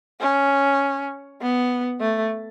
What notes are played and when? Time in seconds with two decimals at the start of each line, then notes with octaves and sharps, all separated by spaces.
0.20 C#4
1.41 B3
2.01 A3